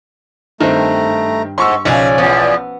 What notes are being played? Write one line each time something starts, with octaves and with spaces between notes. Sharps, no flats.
G2 D#3 A3 C4 A#5
G#2 C6 C#6 E6
B1 C#3 F3 C#4 F#4 D5 G#5
E2 F3 B3